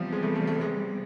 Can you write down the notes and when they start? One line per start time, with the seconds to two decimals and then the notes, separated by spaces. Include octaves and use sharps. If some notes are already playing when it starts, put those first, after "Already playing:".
Already playing: C3 E3 F3 G3 B3
0.12 G#3
0.23 A3
0.35 A3
0.47 A3
0.61 G#3